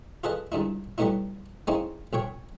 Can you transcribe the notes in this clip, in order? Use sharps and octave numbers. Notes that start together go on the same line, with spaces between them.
F4 G#4 A4 B4 D#5
C#2 G2 D#4 E4
F#3 G3 A3 B3 D#4 E4
G#3 A#3 C4 C#4 D#4 E4
B1 A#2 C#5 G5